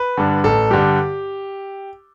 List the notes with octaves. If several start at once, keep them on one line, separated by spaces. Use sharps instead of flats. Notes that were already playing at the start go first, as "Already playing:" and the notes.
Already playing: B4
G2 D3
A1 A4
G2 D3 G4